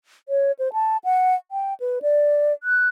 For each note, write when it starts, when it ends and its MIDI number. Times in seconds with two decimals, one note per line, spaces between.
0.29 0.52 73
0.59 0.72 72
0.73 0.97 81
1.04 1.35 78
1.51 1.74 79
1.80 1.99 71
2.02 2.53 74
2.63 2.88 90